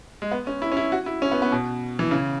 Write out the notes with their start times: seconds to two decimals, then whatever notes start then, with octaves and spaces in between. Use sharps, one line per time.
0.22 G#3
0.32 B3
0.47 C#4
0.62 E4
0.72 C#4
0.77 E4
0.92 F#4
1.06 E4
1.22 C#4
1.31 B3
1.42 B3
1.52 B2
1.99 E3
2.11 C#3